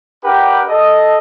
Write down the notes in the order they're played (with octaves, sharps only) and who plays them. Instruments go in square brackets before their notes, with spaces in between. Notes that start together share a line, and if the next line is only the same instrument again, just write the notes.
[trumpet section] D4 G4 A#4 B4 F#5 G5
A4 D#5